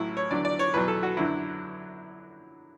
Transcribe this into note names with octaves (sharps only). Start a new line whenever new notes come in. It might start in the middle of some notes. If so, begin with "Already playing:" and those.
Already playing: A1 A2 F#3 E4
C#5
E2 D3 F#3 D5
D5
C#5
E2 B2 F#3 B4
A4
F#4
F#2 D3 F#3 E4